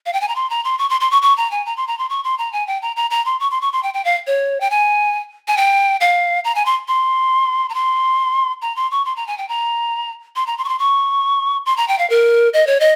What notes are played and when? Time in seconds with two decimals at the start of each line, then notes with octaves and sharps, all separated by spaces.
0.06 F5
0.13 G5
0.21 G#5
0.28 A#5
0.36 C6
0.50 A#5
0.64 C6
0.79 C#6
0.89 C6
1.01 C6
1.11 C#6
1.22 C#6
1.37 A#5
1.51 G#5
1.66 A#5
1.77 C6
1.87 A#5
1.99 C6
2.10 C#6
2.24 C6
2.38 A#5
2.53 G#5
2.67 G5
2.82 A#5
2.96 A#5
3.11 A#5
3.25 C6
3.40 C#6
3.51 C6
3.62 C#6
3.73 C6
3.83 G5
3.94 G5
4.05 F5
4.27 C#5
4.61 G5
4.70 G#5
5.48 G#5
5.57 G5
6.01 F5
6.44 A#5
6.55 G#5
6.66 C6
6.88 C6
7.70 A#5
7.74 C6
8.62 A#5
8.76 C6
8.91 C#6
9.05 C6
9.16 A#5
9.27 G#5
9.38 G5
9.49 A#5
10.36 C6
10.47 A#5
10.58 C6
10.64 C#6
10.69 C6
10.79 C#6
11.66 C6
11.77 A#5
11.88 G5
11.99 F5
12.10 A#4
12.53 D#5
12.67 C#5
12.80 D#5